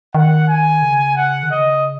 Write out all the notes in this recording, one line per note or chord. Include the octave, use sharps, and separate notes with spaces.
D#3 F#5
G#5
C#3
F#5
D#3
C#3 D#5